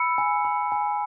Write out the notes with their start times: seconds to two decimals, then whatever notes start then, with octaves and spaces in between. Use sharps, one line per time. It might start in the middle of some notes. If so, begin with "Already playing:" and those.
Already playing: B5 E6 C#7
0.18 G#5
0.45 B5
0.72 G#5